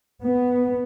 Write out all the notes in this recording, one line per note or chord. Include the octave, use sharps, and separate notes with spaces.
B3